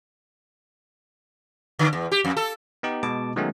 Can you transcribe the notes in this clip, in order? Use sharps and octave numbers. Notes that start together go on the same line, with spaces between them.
D3
E2
G4
F2
A4
B3 D#4 G4
B2 G#3 A5 D6
D#3 F#3 G#3 A3 B3 C#4